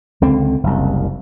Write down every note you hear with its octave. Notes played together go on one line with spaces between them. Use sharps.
C#2 D3 C4
F#1 C2